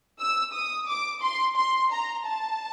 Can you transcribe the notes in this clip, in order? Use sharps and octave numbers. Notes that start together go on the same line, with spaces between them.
E6
D#6
D6
C6
C6
A#5
A5